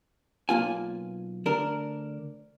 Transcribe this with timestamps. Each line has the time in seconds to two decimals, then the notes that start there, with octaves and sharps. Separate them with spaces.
0.49 B1 A#3 F4 G#5
1.46 D2 D4 A#4